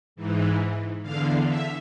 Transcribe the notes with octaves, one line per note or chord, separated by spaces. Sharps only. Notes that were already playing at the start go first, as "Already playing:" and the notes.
G#2 E3
E2 D3 F5
E5